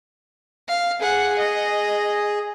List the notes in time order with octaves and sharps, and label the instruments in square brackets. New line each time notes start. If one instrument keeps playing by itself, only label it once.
[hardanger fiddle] F5
G#4 F#5
[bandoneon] G#4 [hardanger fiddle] D#5